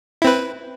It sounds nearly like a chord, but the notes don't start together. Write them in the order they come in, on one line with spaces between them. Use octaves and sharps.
E4 C4 B4